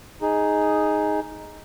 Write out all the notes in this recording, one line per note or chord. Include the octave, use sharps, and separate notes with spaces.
D#4 G#4